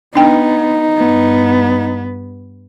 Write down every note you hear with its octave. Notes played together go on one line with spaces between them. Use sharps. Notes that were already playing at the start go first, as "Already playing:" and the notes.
B3 D4 D#4 G5
G2 B3